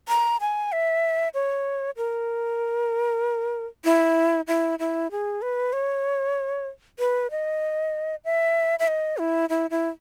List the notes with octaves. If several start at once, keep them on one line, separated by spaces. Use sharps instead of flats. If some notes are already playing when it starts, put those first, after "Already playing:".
A#5
G#5
E5
C#5
A#4
E4
E4
E4
G#4
B4
C#5
B4
D#5
E5
E5
D#5
E4
E4
E4